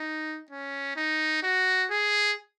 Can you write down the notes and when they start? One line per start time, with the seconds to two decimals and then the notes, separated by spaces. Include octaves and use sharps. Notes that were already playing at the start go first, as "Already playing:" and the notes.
Already playing: D#4
0.50 C#4
0.96 D#4
1.43 F#4
1.90 G#4